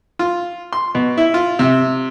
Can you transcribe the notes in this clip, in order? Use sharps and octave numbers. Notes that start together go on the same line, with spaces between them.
F4
C6
B2
E4
F4
C3